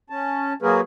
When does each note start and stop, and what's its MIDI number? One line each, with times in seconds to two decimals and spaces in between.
0.10 0.53 61
0.10 0.53 81
0.62 0.81 54
0.62 0.81 58
0.62 0.81 66
0.62 0.81 68
0.62 0.81 70
0.62 0.81 71